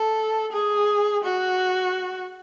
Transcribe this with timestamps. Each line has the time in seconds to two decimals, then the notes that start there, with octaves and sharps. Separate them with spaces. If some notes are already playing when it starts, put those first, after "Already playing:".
Already playing: A4
0.52 G#4
1.24 F#4